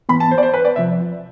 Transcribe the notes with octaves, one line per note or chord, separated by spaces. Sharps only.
G#2 E3 B3 B5
A5
C5
D5
C5
B4
D5
C3 F3 E5